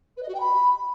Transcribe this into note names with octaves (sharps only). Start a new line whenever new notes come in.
B4
D#5
F#4
G5
B5